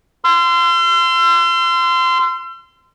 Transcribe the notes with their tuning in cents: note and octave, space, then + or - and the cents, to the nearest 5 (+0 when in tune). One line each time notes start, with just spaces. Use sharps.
C6 -20 E6 +45